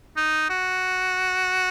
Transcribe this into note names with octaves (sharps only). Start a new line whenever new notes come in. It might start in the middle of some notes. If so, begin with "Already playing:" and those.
D#4
F#4